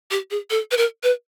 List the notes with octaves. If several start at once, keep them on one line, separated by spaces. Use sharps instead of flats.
G4
G#4
A4
B4
A#4
B4